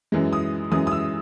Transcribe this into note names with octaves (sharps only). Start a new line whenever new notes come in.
F#2 E3 G#3
D#6
F#2 E3 G#3 D#6
D#6
E6